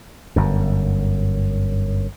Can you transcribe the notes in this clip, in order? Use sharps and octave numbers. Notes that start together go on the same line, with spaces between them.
G1 F#2